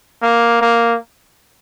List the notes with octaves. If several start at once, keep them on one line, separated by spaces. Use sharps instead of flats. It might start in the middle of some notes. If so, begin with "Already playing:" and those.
A#3
A#3